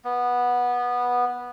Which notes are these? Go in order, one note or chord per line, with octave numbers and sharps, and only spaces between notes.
B3